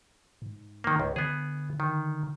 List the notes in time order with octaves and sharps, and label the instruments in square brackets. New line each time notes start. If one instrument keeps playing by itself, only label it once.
[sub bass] G#2
[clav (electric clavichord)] D#3 A#3
C#2
[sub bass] D3 [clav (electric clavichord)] B3 G#4
[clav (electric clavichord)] D#3